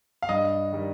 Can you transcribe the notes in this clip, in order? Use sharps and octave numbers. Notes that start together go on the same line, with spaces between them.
F5
G2 D#5
D#3 G3